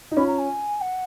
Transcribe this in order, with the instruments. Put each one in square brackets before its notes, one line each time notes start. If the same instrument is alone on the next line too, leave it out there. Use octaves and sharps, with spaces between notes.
[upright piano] D#4
[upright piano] C#4 F4 [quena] B5
[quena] A#5
G#5
F#5